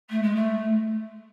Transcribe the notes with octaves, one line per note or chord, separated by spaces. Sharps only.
A3
G#3
A3